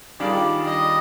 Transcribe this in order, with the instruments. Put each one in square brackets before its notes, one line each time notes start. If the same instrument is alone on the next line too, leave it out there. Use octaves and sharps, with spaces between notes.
[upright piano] D#3 G3 D4 F4 G#4 [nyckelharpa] D5
[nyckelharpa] D#5